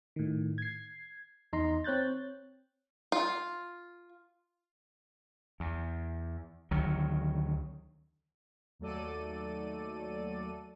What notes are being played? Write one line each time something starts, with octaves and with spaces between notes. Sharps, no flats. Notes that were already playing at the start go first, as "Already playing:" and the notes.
A2 D#3
G#6 C7
E2 D#4 A#5 C6
C4 C#5 F#6 G6 A6
F4
E2
D2 D#3 F#3
D#2 F#3 A3 A4 D5 D#7